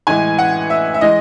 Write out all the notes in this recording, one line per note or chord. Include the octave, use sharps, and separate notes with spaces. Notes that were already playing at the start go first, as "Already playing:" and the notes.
A2 E3 G#3 G#5
F#5
E5
E5
E3 G#3 D#5